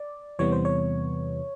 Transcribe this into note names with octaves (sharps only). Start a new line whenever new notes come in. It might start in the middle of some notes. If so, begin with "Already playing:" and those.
Already playing: D5
E2 C3 E3 G3 B3 C#5
C5
C#5